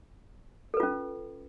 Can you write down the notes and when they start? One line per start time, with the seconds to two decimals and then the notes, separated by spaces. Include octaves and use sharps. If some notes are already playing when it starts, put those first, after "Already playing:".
0.74 A4
0.77 B4
0.80 F4
0.83 C#4